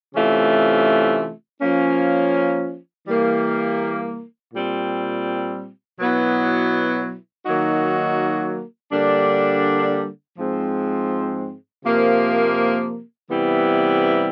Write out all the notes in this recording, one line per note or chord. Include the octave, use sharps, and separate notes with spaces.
C3 E3 A3 C#4 F4
F3 A#3 C#4
E3 G3 A#3
A#2 G3 C4
B2 F#3 B3 E4
D#3 F#3 A#3 D#4 F#4
D3 G3 A#3 D4
G#2 F3 G#3 C4
C3 F3 A#3
C3 E3 G3 B3 E4